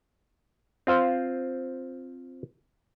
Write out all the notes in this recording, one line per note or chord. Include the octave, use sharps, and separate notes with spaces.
C4 F4 C5